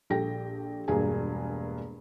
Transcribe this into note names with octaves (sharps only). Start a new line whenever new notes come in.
A#1 G4 A4 G5 A#6
E1 G2 A#3 G#4 G#5